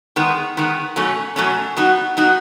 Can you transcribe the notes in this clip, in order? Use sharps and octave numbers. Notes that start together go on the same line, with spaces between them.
D#3 G#3 B3
D#3 G#3 B3
B2 F#3 A3 C#4
B2 F#3 A3 C#4
F#3 B3 D#4 F#4
F#3 B3 D#4 F#4